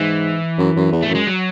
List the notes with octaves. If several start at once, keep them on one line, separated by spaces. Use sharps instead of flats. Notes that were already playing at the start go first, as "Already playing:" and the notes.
Already playing: G#2 E3
F#2
F#2
E2
A3
F#2
G#3
F#3